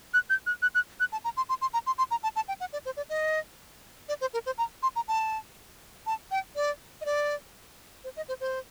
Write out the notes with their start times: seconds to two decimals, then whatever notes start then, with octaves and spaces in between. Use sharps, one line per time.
0.14 F#6
0.30 G6
0.46 F#6
0.62 F#6
0.75 F#6
1.00 F#6
1.12 A5
1.24 A#5
1.37 C6
1.49 C6
1.62 C6
1.74 A#5
1.87 C6
1.98 C6
2.11 A#5
2.23 A5
2.36 A5
2.48 G5
2.60 F#5
2.73 D5
2.86 C5
2.97 D5
3.10 D#5
4.09 D5
4.21 C5
4.33 A#4
4.46 C5
4.58 A#5
4.83 C6
4.96 A#5
5.08 A5
6.06 A5
6.31 G5
6.56 D5
7.01 D#5
7.05 D5
8.04 C5
8.17 D#5
8.29 C5
8.41 C5